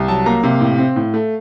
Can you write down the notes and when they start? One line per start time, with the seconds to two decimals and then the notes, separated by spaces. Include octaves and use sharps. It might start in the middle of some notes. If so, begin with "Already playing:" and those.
Already playing: C2
0.08 F#3 A5
0.26 A#3 A#5
0.43 C3 F5
0.61 A2
0.78 C4
0.96 A2
1.14 A3